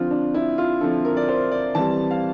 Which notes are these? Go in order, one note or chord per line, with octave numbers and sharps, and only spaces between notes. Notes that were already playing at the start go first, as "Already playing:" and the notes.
Already playing: D3 F3 C4 F4
D4
E4
F4
D3 F3 C4 A4
A#4
D5
C5
D5
E3 G3 C4 A5
F5